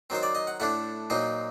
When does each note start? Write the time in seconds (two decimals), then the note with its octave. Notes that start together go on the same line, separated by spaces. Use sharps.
0.10 D#3 F#3 C4 C5
0.23 D5
0.35 D#5
0.47 F#5
0.60 A2 A3 D4 F#5
1.10 A#2 F#3 C4 D#4